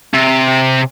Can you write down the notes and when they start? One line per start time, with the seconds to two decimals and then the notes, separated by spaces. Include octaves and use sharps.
0.14 C3